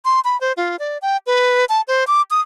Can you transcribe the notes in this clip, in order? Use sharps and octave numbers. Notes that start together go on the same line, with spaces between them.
C6
B5
C5
F4
D5
G5
B4
A5
C5
D6
D#6